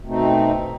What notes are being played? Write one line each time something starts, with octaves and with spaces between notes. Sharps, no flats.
B2 A3 C4 D#4